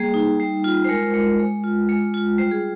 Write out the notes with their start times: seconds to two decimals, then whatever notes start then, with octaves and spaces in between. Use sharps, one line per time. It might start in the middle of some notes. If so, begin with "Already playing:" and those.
Already playing: G3 A#3 G#4
0.14 D#4
0.40 G3
0.64 F4
0.84 C5
0.89 G#3 A#4
1.14 G#3
1.39 G#3
1.64 F4
1.89 G#3
2.14 F4
2.38 G3 C5
2.51 G#4